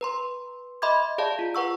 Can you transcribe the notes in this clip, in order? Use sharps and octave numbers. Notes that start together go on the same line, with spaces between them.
B4 A#5 C6
D#5 E5 B5 C6 D6 G#6
G#4 D5 F5 A5
F4
B4 F#5 C#6 E6